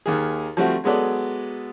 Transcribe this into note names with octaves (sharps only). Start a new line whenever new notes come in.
D#2 D#3 G#4
F3 G3 A3 C4 F#4
F#3 G#3 B3 A4 D5